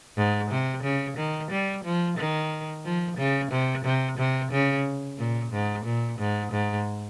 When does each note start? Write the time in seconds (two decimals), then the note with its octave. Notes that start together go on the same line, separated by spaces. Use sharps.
0.17 G#2
0.50 C3
0.83 C#3
1.17 D#3
1.51 G3
1.84 F3
2.17 D#3
2.85 F3
3.18 C#3
3.51 C3
3.85 C3
4.18 C3
4.52 C#3
5.18 A#2
5.52 G#2
5.85 A#2
6.19 G#2
6.52 G#2